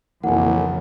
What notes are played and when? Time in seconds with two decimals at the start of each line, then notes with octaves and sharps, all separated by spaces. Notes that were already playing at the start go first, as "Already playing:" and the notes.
0.24 B1 F2 C#3 E3 A#3 F#5 G#5